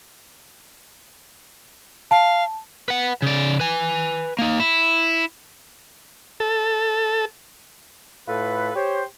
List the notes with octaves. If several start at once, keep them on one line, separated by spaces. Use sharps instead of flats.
F5 A5
B4 F#5
C#3 D5
B4 G#5
A#3 D#4
E4
A4
A2 F4 A4 B4
G4 C5 C#5